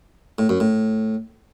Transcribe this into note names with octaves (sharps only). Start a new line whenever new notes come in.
A2
F#2
A2